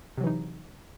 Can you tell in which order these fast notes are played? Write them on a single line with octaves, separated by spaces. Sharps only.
C3 F#3 E3 D#4